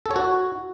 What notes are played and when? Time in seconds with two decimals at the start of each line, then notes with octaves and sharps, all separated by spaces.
0.06 A4
0.11 C#5
0.16 F#4